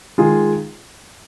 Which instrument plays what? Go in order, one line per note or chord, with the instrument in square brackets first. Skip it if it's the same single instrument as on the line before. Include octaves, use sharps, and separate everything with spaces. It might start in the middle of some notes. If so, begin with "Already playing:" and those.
[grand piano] D#3 G#3 F4 G#4